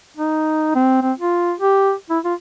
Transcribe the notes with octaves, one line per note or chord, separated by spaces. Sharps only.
D#4
C4
C4
F4
G4
E4
F4